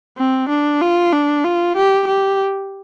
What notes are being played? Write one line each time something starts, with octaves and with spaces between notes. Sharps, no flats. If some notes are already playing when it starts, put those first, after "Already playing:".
C4
D4
F4
D4
F4
G4
G4